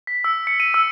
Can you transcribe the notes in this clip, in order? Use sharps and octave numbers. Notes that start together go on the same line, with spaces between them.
B6
E6
C#7
D#7
E6